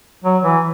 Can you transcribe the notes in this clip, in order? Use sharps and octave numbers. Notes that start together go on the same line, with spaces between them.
F#3
E3